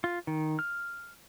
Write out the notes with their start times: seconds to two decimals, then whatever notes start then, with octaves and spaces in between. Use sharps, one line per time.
0.04 F4
0.27 D#3
0.59 F6